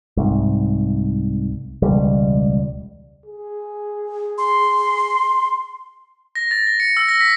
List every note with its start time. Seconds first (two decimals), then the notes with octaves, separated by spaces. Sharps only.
0.17 C2 G#2
1.82 E1 C#2 G3
3.26 G#4
4.38 C6
6.35 A#6
6.51 A6
6.67 A#6
6.80 C#7
6.97 E6
7.08 A#6
7.21 B6